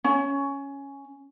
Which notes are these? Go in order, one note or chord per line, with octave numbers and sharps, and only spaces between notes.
C#4